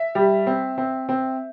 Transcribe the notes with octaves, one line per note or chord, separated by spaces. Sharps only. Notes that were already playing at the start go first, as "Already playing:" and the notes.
Already playing: E5
G3
C4
C4
C4